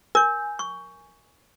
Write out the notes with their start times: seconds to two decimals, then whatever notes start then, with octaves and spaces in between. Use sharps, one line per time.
0.15 A#4 G#5 G6
0.59 C#6